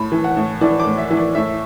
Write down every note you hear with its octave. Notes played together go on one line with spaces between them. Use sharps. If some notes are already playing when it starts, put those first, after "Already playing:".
Already playing: A2 B5
E3
F#5
A2
E3 D5
D6
A2
E5
E3
D5
A2 E5